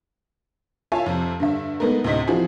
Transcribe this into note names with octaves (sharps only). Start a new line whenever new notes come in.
F4 C#5 E5 G#5 A5
F2 C3
G2 D3 E5
G#3 A3 B3 D#4 A#4
D2 A2 C3 D#5 B6
E3 F3 C4 E4 F#4 G#4